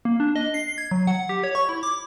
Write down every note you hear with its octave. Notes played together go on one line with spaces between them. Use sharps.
A#3
D4
D#5
C7
G#6
F#3
F#5
G4
C#5
C#6
E4
D6